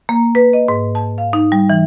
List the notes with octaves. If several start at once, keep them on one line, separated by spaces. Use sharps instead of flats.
A#3
B4
D#5
G#2
A5
F5
D#4
G3
E3